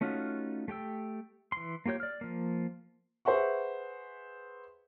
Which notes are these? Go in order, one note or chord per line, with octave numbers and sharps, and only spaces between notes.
A3 C#4 D#4 F4 F#4
A3 G4 G5 E6
E3 C6
A#3 F4 G4 C#5 G6
D5 F6
F3 A#3
G#4 B4 C5 E5 F#5 C#6